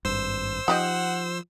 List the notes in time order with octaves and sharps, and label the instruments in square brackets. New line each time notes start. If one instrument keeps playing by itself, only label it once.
[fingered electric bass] G#1 G2 [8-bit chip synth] C5 E6
[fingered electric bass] F3 [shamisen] D#4 G4 D#5 [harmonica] F#5